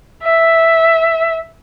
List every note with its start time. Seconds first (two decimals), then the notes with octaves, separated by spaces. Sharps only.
0.23 E5